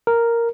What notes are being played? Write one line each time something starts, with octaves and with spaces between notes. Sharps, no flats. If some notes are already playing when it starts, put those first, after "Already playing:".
A#4